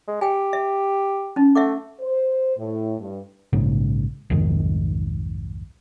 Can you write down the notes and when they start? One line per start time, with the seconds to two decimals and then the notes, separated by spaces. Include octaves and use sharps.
0.08 G#3
0.21 G4 G5 G#5
0.53 E5
1.36 C#4 D#4
1.55 A3 E5 F#5 D6
2.00 C5
2.57 A2
2.99 G2
3.53 A#1 G#2 C#3
4.30 B1 F2 G#2 D#3